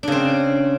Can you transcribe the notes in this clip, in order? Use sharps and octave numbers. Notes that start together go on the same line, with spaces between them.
C#3 C4 D4